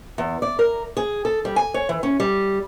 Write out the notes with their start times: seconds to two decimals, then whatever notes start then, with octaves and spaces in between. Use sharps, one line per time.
0.18 E2
0.42 D5
0.59 A#4
0.97 G#4
1.25 A4
1.45 G3
1.56 G#5
1.74 C#5
1.89 E3
2.03 C#4
2.20 G3